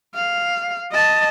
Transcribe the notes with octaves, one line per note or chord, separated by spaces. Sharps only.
F5
D#5 A5